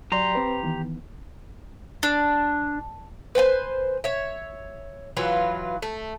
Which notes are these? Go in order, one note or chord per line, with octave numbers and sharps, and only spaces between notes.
F#3 G4 D5 A#5 C6
C4 B4
D#3 E3 B3
D4
B4 C5 G5 G#5
C#5 E5
E3 F#3 F4 B4
A3